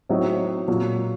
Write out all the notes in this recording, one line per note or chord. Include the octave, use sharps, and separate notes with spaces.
A2 F#3 C4 D#4
A#2 F#3 A#3